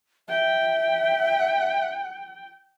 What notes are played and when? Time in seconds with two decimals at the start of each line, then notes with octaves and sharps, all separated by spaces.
0.29 E5 G5